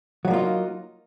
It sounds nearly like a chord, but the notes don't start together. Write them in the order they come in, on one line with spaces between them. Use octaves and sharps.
F#3 G3 A#3 F4 D#4